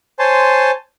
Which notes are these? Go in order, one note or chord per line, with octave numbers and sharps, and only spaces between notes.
C5 C#5 G#5 A5 C6